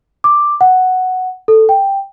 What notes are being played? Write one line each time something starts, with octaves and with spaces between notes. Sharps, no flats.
D6
F#5
A4
G5